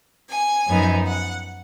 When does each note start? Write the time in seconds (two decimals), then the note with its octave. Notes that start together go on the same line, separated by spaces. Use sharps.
0.29 G#5
0.67 F#2 F3 B3 D#4
1.05 F#5